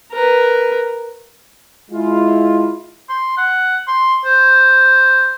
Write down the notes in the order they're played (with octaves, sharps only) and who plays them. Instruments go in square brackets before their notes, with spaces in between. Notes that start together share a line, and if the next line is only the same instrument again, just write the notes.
[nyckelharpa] A#4 B4
[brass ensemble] G#3 E4 F4
[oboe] C6
F#5
C6
C5